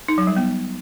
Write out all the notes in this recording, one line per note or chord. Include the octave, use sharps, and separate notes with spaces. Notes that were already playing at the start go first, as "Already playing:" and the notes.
D#4
F#3
G3
B3